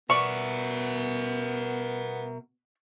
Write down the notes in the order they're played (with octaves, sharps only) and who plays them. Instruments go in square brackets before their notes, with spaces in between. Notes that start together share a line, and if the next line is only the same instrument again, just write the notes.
[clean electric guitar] B2 F#4 [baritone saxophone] B3 [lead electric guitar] A#4 E5 [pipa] D5 C#6